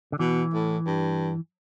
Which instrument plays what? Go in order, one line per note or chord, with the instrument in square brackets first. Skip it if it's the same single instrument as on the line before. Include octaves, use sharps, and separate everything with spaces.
[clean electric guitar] D3
[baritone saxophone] B2 [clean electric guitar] E3
[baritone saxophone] A2
G2